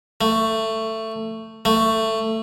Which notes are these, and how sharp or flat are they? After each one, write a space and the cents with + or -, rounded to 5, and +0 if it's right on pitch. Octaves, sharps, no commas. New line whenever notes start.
A3 +15
A3 +15